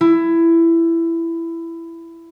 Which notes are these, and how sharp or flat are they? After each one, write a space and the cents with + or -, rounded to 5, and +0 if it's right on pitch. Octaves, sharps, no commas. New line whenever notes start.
E4 +15